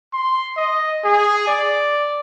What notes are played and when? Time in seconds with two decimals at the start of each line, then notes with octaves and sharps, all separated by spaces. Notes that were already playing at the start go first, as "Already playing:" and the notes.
0.13 C6
0.57 D#5
1.05 G#4
1.47 D5